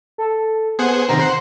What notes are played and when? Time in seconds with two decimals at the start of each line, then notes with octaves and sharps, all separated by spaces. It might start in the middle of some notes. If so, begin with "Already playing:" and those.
0.18 A4
0.79 B3 G#4 C5 F#5
1.09 C3 D#3 C4 A#5
1.20 C5 F#5 C6